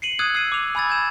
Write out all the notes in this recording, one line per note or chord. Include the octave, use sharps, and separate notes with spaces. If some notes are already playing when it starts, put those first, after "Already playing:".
C7 C#7 D#7 F#7
D#6 E6 F#6 G#6 D#7
E6 C7 D#7
D6 F7
G#5 B5 E6 G#6 A6
G6 G#6 E7